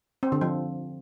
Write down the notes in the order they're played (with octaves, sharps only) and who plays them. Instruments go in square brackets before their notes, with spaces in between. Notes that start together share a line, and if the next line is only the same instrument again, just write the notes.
[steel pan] C4
D3
F3